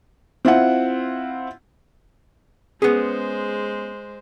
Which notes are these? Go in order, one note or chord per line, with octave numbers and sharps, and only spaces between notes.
C4 E4 F4 F#5
G#3 B3 C#4 G#4 C5